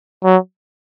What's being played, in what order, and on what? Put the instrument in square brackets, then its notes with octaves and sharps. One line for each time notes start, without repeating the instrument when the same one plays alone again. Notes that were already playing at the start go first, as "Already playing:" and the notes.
[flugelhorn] F#3